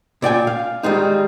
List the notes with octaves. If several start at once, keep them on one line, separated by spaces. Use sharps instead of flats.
A#2 D5 G5 G#5
F5
D#3 G3 G#3 D#4